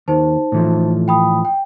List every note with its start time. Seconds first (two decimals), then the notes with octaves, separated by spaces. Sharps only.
0.08 D#2 D#4 C5 A5
0.52 A2 E3 F3
1.08 G5 B5 D#6
1.45 G5